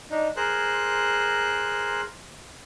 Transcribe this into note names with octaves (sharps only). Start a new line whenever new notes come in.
D4 D#4
G#4 A#4 C5 F#6